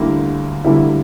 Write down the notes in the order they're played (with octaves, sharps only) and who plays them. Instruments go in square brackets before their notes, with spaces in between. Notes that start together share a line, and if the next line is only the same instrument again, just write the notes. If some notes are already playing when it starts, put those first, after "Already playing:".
Already playing: [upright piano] D2 D3 G3 A#3 E4
D2 D3 G3 A#3 E4